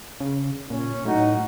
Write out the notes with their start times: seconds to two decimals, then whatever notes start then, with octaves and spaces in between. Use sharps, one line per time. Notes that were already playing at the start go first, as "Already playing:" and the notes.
0.20 C#3
0.70 A#2 C#4
1.05 A2 F#3 D#4 F#4